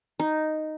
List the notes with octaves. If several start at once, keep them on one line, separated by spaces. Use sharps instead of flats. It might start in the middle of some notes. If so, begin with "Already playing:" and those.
D#4